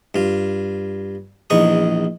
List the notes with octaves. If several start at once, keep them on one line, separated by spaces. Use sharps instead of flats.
G2 F4
A#1 E2 D#4 C#6 D#6